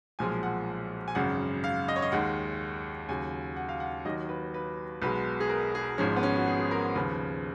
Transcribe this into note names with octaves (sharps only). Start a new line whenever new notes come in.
B1 A#2 F3 G#3 G#5
F#5
G#5
G#1 F#2 C#3 F#5
F5
D#5
C#5
D#5
D#2 D#3 G#3 F#5
D#2 C#3 F#3 G#5
F#5
F5
F#5
D#2 D#3 F#3 D#5
B4
B4
B1 B2 G#3 B4
G#4
A#4
G#4
G#1 G#2 F3 G#3 C#4
B3
C#4
F#4
G#4
G#4
A#4
D#2 C#3 F3 B4